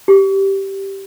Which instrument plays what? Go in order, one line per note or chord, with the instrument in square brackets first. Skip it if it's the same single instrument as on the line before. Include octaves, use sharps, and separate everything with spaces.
[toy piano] G4